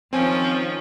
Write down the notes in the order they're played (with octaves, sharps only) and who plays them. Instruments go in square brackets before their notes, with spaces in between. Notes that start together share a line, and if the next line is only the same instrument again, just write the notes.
[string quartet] D#3 F3 C#4 [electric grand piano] C4 G#5